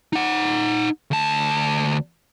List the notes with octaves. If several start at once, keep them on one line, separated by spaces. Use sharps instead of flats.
D#4 F#5
D2 A5